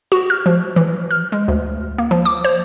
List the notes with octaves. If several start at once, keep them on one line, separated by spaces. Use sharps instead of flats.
F#4
F6
F3
E3
F6
G#3
D2
A#3
F3
D6
C5